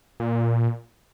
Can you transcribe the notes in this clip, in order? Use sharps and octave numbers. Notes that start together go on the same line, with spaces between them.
A#2